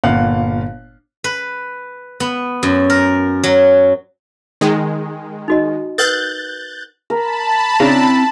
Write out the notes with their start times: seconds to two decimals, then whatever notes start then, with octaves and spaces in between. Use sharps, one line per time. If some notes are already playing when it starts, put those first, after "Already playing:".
0.04 G1 A#2 F5 F#5 F#6
1.24 B4
2.20 B3
2.63 F#2
2.90 A#4
3.43 F#3
4.61 D#3 G#3
5.48 D#4 F#4 D#5
5.98 A#4 B4 F#5 F#6 G6 A6
7.10 A#4 A5 B5
7.80 C#3 C4 D4 E4 A#5